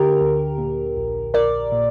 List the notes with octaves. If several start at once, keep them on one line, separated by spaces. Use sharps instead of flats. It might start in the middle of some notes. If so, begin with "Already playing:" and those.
Already playing: D3 G4 A#4
D2
A#2
A#1
A#1 A#4 D5
A#2